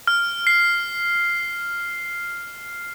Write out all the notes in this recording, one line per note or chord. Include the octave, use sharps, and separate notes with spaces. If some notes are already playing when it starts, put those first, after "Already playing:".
F6
C7